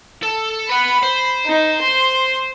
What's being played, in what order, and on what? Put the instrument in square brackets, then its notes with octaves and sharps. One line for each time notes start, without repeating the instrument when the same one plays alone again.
[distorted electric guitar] A4
[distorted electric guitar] B4 F#5 [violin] B5
[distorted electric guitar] C5
[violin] D#4
C6